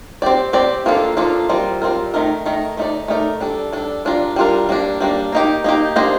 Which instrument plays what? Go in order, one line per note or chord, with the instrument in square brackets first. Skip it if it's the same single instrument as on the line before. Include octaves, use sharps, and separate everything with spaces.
[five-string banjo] C4 G4 D5
C4 G4 D5
F3 A#3 D4 F4 A4
F3 A#3 D4 F4 A4
G3 C4 F4 A#4
G3 C4 F4 A#4
D#3 A3 D#4 A#4
D#3 A3 D#4 A#4
A3 D#4 A#4 D5
A3 D#4 A#4 D5
G3 D4 A4
G3 D4 A4
G3 D4 F4 A#4
G3 D4 F4 A#4
G3 A#3 D4
G3 A#3 D4
A#3 D#4 G4
A#3 D#4 G4
A#3 D4 G4 C5 D#5